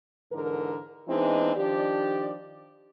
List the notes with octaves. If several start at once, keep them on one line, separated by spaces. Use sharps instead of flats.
G#2 D3 E3 A#4
E3 G#3 B3 C4 D4 D#4
D#3 F3 D4 G4 D5